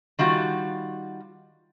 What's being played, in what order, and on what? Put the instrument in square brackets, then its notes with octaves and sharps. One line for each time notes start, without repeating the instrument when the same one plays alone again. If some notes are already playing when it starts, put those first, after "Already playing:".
[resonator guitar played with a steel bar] D#3 G3 F4 F#4